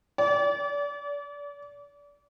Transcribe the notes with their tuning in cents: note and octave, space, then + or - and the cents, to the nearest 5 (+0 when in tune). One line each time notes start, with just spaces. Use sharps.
D5 -35